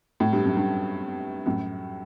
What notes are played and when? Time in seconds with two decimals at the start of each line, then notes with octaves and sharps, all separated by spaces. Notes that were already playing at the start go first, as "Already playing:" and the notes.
0.20 A2
0.33 G2
0.45 F#2
0.57 G2
1.46 F#2 A2